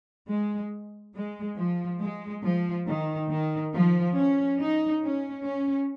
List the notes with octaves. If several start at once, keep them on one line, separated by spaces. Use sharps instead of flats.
G#3
G#3
F3
G#3
F3
D#3
D#3
F3
C#4
D#4
C#4
C#4